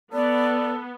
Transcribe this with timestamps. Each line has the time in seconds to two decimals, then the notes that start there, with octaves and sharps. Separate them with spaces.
0.13 B3 A4 D5